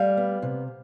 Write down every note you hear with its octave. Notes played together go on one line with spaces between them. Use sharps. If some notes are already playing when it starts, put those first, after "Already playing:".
Already playing: G3 F5
B3
C3